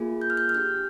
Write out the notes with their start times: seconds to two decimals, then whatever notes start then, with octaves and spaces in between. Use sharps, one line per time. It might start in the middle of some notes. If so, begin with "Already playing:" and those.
Already playing: A#3 F4 G#4
0.21 G6
0.30 F6
0.37 G6
0.49 F6
0.55 D4 G4 G6